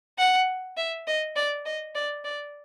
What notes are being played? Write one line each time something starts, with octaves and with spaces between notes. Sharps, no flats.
F#5
E5
D#5
D5
D#5
D5
D5